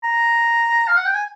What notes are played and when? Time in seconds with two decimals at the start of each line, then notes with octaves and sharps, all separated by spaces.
0.04 A#5
0.88 F5
0.97 F#5
1.06 G5
1.14 G#5